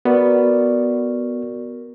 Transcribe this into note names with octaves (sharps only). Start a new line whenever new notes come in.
B3 F#4 A#4 D5